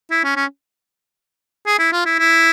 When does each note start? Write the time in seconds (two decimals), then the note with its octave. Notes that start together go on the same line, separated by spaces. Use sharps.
0.11 E4
0.24 C#4
0.36 C#4
1.67 G#4
1.79 E4
1.92 F4
2.06 E4
2.19 E4